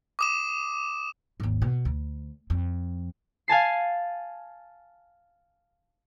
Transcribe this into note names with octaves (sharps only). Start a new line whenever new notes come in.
D6 D#6 E7
G#1 D#2
B2
D2
F2
F5 G#5 A5 C7